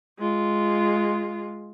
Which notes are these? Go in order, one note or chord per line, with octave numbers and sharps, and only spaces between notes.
G#3 F4